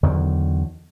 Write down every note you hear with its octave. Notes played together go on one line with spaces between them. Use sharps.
E2 D3 D#3 F#3